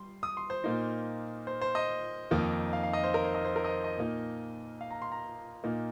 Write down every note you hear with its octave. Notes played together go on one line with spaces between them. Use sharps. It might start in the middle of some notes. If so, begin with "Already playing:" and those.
Already playing: G3 C6
D#6
C6
C5
A#2 A#3 D#4
C5
C5
D#5
F2 D#3 A#3 D#4
F5
F5
D#5
C5
A#4
C5
D#5
C5
A#4
D#5
C5
D#5
A#2 A#3 D#4
F5
A#5
C6
A#5
A#2 A#3 D#4